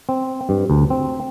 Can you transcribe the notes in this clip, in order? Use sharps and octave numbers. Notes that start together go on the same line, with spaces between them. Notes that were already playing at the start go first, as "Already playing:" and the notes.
C4
G2
D2
C4